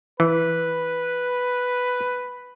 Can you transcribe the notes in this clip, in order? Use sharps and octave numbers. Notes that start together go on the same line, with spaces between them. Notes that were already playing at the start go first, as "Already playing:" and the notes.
E3 B4